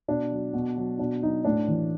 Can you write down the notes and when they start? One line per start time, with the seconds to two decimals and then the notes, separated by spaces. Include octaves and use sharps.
0.08 B2 D4
0.32 F#3
0.53 B2
0.77 F#3
0.99 B2 D4
1.22 F#3 D#4
1.45 A2 D4
1.68 E3